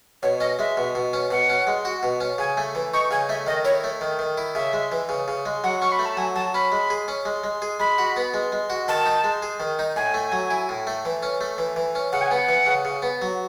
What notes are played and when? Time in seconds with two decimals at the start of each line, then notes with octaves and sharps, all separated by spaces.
0.23 B2 C#5
0.40 C#4 D#5
0.59 G#3 E5
0.77 B2
0.95 B2
1.13 C#4
1.30 B2 F#5
1.49 C#4
1.67 G#3
1.85 F#4
2.03 B2
2.21 C#4
2.38 C#3 G#5
2.57 A3
2.75 E3
2.93 D#4 C#6
3.11 C#3 G#5
3.29 A3 E5
3.47 D#3 D#5
3.65 E4 C#5
3.84 A3
4.01 D#3
4.19 D#3
4.38 E4
4.55 C#3 E5
4.73 G#3
4.92 E3
5.09 C#3
5.28 C#3
5.46 G#3
5.64 F#3 F#5
5.80 C#4 C#6
5.92 B5
5.99 A3
6.06 A5
6.17 F#3 G#5
6.35 F#3 A5
6.54 C#4 B5
6.72 G#3
6.90 G#4
7.08 C#4
7.25 G#3
7.44 G#3
7.62 G#4
7.80 G#3 B5
7.98 F#4
8.17 B3
8.34 G#3
8.52 G#3
8.70 F#4
8.88 D#3 A5
9.06 D#4
9.24 G#3
9.42 G#4
9.60 D#3
9.79 D#4
9.96 A2 G#5
10.14 A3
10.32 F#3
10.50 E4
10.69 A2
10.87 A3
11.05 E3
11.23 C#4
11.41 A3
11.58 E3
11.76 E3
11.95 C#4
12.12 C#3 F#5
12.21 G#5
12.31 B3 F#5
12.49 E3
12.66 C#3
12.85 C#3
13.02 B3
13.22 F#3